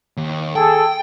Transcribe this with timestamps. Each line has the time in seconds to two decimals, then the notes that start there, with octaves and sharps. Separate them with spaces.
0.17 D#2
0.55 G#4 A4 G5